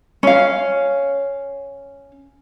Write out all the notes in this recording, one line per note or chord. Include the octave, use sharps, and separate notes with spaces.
C#4 F5